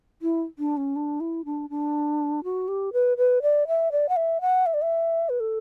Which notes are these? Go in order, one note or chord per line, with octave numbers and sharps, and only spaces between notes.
E4
D4
C#4
D4
E4
D4
D4
F#4
G4
B4
B4
D5
E5
D5
F#5
E5
F#5
E5
D5
E5
B4
A4